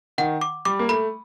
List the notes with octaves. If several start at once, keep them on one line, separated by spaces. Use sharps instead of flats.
D#3 F#5
D6
G3 D6
A#3
A3 B5